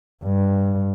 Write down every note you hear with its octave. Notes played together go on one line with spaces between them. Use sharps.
G2